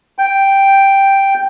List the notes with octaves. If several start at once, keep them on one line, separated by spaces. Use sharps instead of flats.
G5